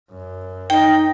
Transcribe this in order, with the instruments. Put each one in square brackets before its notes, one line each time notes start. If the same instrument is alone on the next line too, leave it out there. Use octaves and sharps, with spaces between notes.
[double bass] F#2
[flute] D#4 [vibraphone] G5